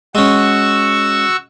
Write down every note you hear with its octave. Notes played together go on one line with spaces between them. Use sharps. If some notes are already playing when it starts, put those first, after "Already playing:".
G#3 C#4 F#4 C#6 E6